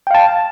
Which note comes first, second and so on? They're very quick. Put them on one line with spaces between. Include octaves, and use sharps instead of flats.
G5 F5 A5